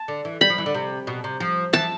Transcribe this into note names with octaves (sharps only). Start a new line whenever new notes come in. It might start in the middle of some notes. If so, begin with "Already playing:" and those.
Already playing: A5
D3
E3
G3 B5
F3
E3
D3
C3
B2
C3
F3
E3 A5